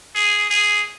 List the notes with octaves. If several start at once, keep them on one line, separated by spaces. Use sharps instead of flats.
G#4
G#4